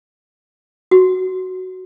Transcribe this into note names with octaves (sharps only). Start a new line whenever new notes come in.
F#4